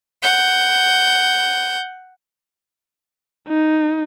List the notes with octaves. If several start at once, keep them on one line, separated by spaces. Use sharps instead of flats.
F#5 G6
D#4